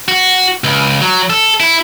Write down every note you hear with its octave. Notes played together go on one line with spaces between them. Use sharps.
F#4
C#2
F#3
A4
E4